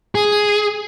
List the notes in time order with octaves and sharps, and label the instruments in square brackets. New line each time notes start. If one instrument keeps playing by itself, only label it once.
[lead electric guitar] G#4